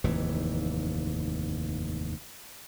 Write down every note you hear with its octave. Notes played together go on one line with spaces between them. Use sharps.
F1 D#2 G#2 E3